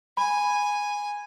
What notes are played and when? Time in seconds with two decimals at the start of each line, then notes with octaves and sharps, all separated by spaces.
0.17 G#5 B5